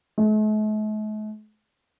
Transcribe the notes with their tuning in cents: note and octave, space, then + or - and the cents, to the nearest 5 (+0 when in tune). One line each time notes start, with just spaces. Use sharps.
A3 -45